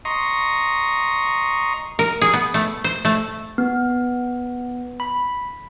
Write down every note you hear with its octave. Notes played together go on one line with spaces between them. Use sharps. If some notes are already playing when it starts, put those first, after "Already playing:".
D#5 A#5 C6 C#6
A#4
G#4
B3
A3
C5
A3
B3
B5